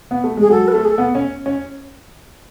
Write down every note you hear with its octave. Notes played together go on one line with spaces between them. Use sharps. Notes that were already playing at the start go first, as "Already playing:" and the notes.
B3
A3
G#3 G#4
F#3 A4
B4
A3 A4
G#4
A4
B3
C#4
C#4